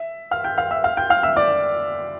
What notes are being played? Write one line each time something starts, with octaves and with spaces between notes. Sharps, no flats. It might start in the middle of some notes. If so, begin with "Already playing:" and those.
Already playing: E5
F5 F6
G5 G6
F5 F6
E5 E6
F5 F6
G5 G6
F5 F6
E5 E6
D5 D6